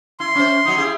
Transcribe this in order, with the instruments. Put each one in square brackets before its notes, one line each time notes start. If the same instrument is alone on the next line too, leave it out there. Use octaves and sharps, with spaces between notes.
[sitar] E4 [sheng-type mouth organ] C6
[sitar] C#4 C5
F#3 D#4
E4 G4 G#4